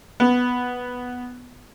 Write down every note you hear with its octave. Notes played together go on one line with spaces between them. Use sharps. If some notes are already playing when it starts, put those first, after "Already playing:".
B3